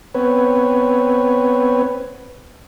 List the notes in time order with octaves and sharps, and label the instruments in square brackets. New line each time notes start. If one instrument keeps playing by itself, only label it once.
[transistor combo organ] B3 C4 B4 C#5